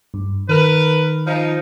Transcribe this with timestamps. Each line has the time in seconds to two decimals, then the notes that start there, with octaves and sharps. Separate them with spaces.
0.14 G2
0.49 D#3 A#4 B4
1.26 F3 D#4